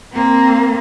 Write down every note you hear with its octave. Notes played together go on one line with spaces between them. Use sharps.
A#3 C4